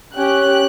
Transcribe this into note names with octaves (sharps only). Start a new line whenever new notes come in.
C#4 G4 F#6